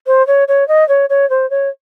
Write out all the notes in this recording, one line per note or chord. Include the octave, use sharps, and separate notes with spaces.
C5
C#5
C#5
D#5
C#5
C#5
C5
C#5